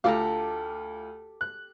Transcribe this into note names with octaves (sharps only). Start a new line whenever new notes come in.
D2 F4 G4 A4 F5 A#5 D6
F#6